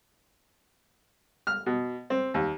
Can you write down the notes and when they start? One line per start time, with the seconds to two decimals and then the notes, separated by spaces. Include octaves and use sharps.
1.47 F6
1.66 B2
2.10 C4
2.34 D#2